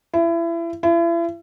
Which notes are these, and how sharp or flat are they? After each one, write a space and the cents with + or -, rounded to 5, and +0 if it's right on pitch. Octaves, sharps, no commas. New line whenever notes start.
E4 +30
E4 +40